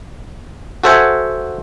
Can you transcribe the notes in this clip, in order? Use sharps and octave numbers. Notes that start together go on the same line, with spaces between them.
F#4 A4 C5 E5 F#5 G#5